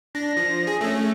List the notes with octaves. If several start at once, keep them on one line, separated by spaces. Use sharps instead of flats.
D4 A#6
F3
G#4
A3 C#4